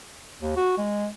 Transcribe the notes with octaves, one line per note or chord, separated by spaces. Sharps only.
D#2
F#4
G#3